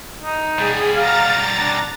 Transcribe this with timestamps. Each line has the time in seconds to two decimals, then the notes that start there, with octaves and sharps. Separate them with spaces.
0.22 D#4
0.58 B2 G3 G#4
0.96 F5 A#5 A6
1.60 D4